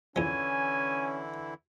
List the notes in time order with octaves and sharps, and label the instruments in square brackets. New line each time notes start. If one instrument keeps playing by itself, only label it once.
[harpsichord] E2 F3 [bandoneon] D3 E3 E4 [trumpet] C#4 [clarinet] G#5